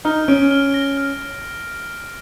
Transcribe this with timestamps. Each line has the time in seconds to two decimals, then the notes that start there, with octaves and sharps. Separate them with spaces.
0.05 D#4 F6
0.28 C#4 D7
0.51 F6
0.74 A#6
0.97 F6